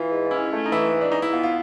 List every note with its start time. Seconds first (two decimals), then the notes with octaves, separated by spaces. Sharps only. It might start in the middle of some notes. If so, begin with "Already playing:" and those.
Already playing: E3 F4
0.11 G#2
0.26 F4
0.31 C#4 E4
0.51 A3
0.66 D#4
0.72 E3 E4
0.93 G#2
1.01 D4
1.12 E3 D#4
1.22 E4
1.33 B3 F4
1.43 F4